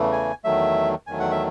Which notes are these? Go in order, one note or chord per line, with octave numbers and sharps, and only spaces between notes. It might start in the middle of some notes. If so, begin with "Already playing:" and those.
Already playing: E2 C#3 E3 A3
G#5
E2 D#3 F#3 A3 E5
E2 D#3 F#3 A3 G#5
F#5
E5